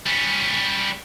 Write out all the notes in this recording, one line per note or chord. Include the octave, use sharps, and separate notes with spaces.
G3 C#4